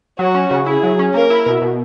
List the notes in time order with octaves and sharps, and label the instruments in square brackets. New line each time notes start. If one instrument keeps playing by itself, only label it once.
[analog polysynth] F#3 [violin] F#4
[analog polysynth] C#4
C#3
[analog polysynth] E4 [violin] G#4
[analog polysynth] F#3
C#4
[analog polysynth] A#3 [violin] A#4
[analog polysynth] E4
B2
B2